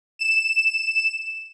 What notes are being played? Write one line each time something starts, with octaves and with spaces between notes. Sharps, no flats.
E7